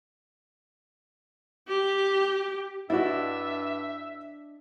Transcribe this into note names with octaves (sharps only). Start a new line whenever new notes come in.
G4
G2 D4 E4 F#4 D#5 E5